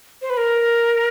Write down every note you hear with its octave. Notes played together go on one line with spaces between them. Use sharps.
C5
B4
A#4